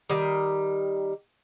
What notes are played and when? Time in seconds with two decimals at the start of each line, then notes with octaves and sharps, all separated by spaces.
0.10 D#3 G3